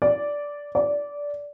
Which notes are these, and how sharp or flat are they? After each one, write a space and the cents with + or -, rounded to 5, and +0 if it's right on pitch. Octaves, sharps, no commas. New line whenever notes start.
D5 -10
D5 -15